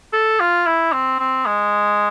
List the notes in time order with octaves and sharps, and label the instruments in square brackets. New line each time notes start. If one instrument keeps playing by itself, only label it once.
[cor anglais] A4
F4
E4
C4
C4
G#3